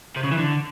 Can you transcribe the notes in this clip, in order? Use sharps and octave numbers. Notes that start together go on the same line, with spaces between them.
C3
C#3
E3
D3